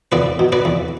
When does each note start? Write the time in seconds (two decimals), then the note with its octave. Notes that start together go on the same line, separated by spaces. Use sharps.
0.12 E2 B4 D5
0.39 B2
0.52 B4 D5
0.65 E2